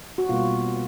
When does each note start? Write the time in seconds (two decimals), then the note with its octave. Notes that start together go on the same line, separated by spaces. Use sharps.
0.18 F#4
0.29 B2 G3 A#3 F4